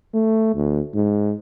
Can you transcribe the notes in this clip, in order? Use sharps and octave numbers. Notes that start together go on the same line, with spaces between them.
A3
D2
G#2